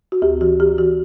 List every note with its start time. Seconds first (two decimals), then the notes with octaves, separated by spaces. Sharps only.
0.12 F#4
0.22 D2 G4
0.41 E3 F#4
0.60 E3 G4
0.78 E3 F#4